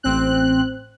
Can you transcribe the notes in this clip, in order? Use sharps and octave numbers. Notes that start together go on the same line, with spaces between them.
A1 C4 F#6